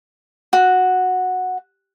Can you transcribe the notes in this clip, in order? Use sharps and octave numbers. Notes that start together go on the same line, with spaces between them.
F#4